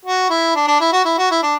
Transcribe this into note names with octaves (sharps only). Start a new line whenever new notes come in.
F#4
E4
D4
D4
E4
F#4
E4
F#4
E4
D4